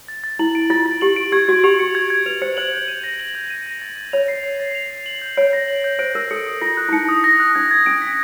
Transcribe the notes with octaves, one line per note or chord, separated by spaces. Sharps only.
A6
A6
E4 F#7
D7
F4 A6
A6
G4 F#7
D7
G4 G#6
F#4 G#6
G4 F7
C#7
G#6
G#6
B4 F7
C5 C#7
C5 F#7
G6
D#7
A#6
F#7
G6
D#7
A#6
A6
A6
C#5 F7
C7
A6
A6
F7
C7
F#7
G6
C#5 D7
A#6
F#7
G6
C5 D7
A#4 A#6
A4 C#7
D#6
F4 A#6
F#6
E4
D#4 C#7
D#6
A#6
F#6
D4 G#6
G#6
C#4 D7
B6